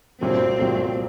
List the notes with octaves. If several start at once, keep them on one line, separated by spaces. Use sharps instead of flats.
C2 A#2 F#3 A3 C4
C2 A#2 F#3 A3